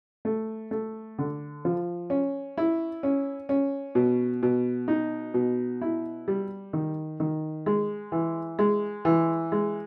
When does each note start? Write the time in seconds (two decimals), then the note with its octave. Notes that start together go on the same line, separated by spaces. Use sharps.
0.25 A3
0.71 A3
1.19 D3
1.65 F3
2.10 C#4
2.58 E4
3.03 C#4
3.49 C#4
3.95 B2
4.43 B2
4.88 D#4
5.34 B2
5.81 E4
6.28 G3
6.73 D#3
7.20 D#3
7.66 G#3
8.12 E3
8.59 G#3
9.05 E3
9.52 G#3